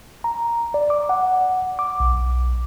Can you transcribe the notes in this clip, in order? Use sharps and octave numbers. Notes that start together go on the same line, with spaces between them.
A#5
D5
D6
F#5
D6
B1